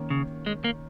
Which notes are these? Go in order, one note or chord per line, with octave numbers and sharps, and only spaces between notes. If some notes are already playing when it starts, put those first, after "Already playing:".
Already playing: D#3 A#3 C#4
C#3
G#3
A#3